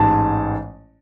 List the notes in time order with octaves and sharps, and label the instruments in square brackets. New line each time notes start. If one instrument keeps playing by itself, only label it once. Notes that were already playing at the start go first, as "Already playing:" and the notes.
Already playing: [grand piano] A1 G#2 A5